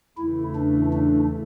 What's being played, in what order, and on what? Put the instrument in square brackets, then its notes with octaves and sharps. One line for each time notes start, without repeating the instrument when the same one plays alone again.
[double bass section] E2 C#3 E3 A3 [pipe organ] E4
[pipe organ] D4
D4